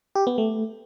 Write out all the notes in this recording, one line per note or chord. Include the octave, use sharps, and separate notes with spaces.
G4
B3
A3